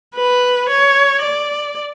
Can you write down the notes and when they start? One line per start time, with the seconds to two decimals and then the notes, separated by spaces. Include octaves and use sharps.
0.15 B4
0.69 C#5
1.22 D5